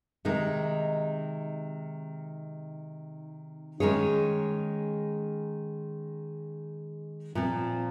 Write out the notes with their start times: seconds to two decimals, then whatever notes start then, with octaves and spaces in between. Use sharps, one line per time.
0.25 C3 D#3 G#3 D#4
3.80 D#3 G#3 C#4 G#4 C#5
7.35 A#2 F3 C4